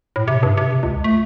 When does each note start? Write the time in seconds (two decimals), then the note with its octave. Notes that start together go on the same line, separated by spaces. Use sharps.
0.16 A2
0.28 C3
0.43 G2
0.57 C3
0.83 C#2
1.04 A3